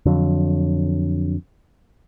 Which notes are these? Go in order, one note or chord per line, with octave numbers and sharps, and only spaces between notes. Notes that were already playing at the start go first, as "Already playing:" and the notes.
F2 D3 F#3